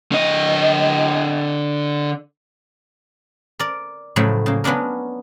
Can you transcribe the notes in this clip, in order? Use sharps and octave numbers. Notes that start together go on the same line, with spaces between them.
D3 D#5
A#4 D5
A2 C#3 F3 F#3 A3
C#3 A#3
F#3 B3 C#4 D4 A#4